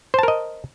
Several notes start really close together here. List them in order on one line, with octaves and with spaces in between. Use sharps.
C5 A5 A#4 D#5